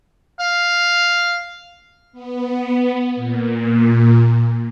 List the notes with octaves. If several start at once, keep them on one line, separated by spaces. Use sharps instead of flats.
F5
B3
A#2